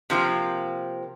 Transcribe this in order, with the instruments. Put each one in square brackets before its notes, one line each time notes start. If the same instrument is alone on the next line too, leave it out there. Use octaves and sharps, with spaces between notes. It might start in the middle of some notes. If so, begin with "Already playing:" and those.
[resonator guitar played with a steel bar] C3 F3 A#3